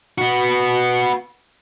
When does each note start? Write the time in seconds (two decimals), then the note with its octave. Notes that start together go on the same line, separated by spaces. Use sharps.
0.18 B3 F#4